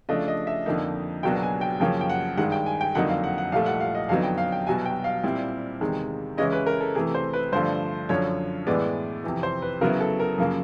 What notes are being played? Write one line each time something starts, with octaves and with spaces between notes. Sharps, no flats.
C#3 F3 A3 D4 D#5
D#5
E5
F2 D3 F3 A#3 D#4
C#2 B2 F#3 A#3 D4 G5
G#5
G5
F#2 C#3 F3 A#3 C#4 G5
G5
F#5
G2 D#3 G#3 F#5
G5
G#5
G5
F2 D3 F#3 A#3 D#4 F#5
F5
F#5
F#5
C2 A#2 F3 A3 F5
F#5
F5
D#5
F2 D3 F#3 B3 D#4 F5
G5
F5
G5
C2 B2 F#3 G#5
G5
F5
A#2 G3 C4 E4
E2 C3 D#3 G#3
C#3 E3 G#3 C#4 E4 D#5
B4
A#4
A4
C3 E3 A3 G#4
C5
B4
G2 D3 F3 A3 C5
F#2 D3 F3 C#5
A2 E3 G#3 B3 D5
F2 C3 E3
C5
B4
C#3 F#3 B3 E4 A#4
A4
A#4
F#2 C#3 F3 A#3